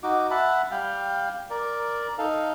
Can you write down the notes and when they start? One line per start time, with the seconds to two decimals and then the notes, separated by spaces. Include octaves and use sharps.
0.03 D#4 F#4 D6
0.31 E5 F#5 A5 B5
0.71 G3 F5 G5
1.50 A#4 D5
2.18 D#4 A4 F5